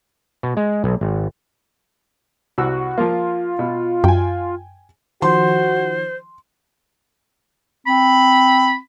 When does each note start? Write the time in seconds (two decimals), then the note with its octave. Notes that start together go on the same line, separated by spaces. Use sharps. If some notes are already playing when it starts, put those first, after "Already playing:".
0.43 B2
0.57 G#3
0.84 B1
1.01 G#1
2.58 C2 F#4 E6
2.98 F3 A#3 F4
3.59 B2
4.04 F#2 G5 G#5
5.22 D#3 F3 F#4 C5 C6
7.87 C4 B5